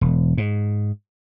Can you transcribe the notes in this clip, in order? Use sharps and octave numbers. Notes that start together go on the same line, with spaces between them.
E1
G#2